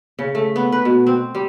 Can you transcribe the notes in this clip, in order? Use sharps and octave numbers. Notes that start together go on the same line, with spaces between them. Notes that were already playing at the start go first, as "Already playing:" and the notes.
C#3
A3
B3
B4
B2
C4
G3